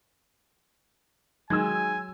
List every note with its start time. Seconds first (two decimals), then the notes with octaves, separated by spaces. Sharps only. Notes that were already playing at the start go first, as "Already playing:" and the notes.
1.50 D#3 F#3 G#3 G#5 E6 G#6